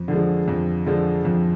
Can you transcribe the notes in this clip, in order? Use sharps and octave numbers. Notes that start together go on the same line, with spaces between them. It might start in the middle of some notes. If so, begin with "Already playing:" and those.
Already playing: F2
D3 F3 G#3
F2
D3 F3 G#3
F2